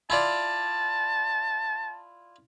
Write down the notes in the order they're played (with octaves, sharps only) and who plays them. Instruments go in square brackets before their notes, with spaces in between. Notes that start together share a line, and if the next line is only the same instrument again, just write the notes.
[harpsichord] E4 F4 D5 [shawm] A5